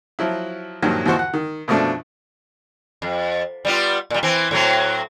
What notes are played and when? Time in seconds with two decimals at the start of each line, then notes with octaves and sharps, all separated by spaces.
0.19 F3 F#3 E4
0.83 G2 A#2 D#3 F3 F#3
1.05 D#2 E3 F3 F#4 C5 C#6
1.19 F#5
1.34 D#3
1.68 F#2 B2 F3 A3 D4
3.02 F2
3.65 G3 B3 F4
4.10 A#2 G3
4.23 E3 C4
4.51 A2 F#3 C4